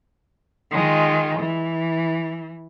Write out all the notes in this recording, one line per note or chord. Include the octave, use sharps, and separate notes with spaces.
D#3 G#3 F4
E3